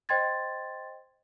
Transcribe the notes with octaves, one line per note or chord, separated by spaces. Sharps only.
C5 D#5 G5 C6 G#6 A6